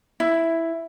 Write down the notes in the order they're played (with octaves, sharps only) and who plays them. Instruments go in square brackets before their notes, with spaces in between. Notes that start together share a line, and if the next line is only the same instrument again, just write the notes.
[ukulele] E4